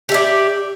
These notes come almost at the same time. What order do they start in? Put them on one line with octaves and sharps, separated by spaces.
G4 E5 D5